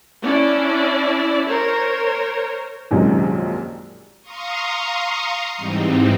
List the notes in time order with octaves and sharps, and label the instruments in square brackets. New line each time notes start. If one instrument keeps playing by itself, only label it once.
[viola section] C#4 D4 E4 D5
A#4 C5 C#5
[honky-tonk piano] A#1 F#2 C3 D#3 F3 G#3
[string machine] F5 A#5 C6 C#6 D#6
G#2 E3 G3 C4 D#4